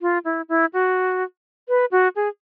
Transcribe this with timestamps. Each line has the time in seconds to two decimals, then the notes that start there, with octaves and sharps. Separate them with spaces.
0.02 F4
0.25 E4
0.49 E4
0.73 F#4
1.69 B4
1.92 F#4
2.16 G#4